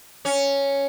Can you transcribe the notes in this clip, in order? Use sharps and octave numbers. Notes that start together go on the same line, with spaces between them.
C#4